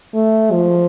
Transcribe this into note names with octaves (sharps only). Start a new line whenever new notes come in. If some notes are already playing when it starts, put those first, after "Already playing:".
A3
F3